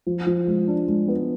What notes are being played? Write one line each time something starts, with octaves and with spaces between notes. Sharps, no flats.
F3
F3
G#3
D4
G#3
B3